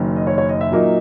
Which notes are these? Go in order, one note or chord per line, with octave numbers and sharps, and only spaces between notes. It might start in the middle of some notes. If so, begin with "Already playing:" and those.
Already playing: F#1 F#2 D#3
D#5
C#5
C#5
D#5
E5
A#2 F#3 A#3 D#4